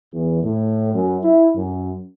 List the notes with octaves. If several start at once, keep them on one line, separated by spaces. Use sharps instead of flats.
E2
A2
F#2
E4
F#2